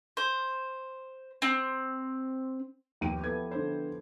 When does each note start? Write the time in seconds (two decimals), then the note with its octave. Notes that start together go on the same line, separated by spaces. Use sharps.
0.17 C5
1.42 C4
3.01 D#2 F3 B3 G4 D#7
3.24 B3 E4 A4 G#6
3.51 D3 C5